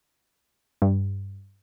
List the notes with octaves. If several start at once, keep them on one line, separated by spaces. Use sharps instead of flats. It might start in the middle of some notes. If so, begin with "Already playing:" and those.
G2